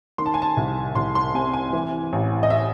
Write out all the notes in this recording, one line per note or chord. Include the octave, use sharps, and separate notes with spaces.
D#3 C6
A5
G#5
A5
C2
C2 C6
C6
C3 G#5
G#5
E3
A1
D#5
E5